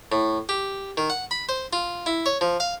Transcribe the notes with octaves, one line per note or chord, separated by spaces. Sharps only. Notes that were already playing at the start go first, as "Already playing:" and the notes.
A2
G4
D#3
F#5
B5
C5
F4
E4
C#5
F3
F5